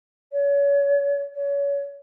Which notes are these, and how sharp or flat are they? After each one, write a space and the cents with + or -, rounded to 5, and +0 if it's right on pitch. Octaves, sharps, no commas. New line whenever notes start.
C#5 +30
C#5 +30